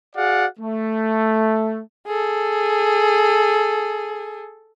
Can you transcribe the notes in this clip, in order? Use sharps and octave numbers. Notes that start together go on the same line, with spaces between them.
F#4 G#4 D5 F5 F#5
A3
G#4 A4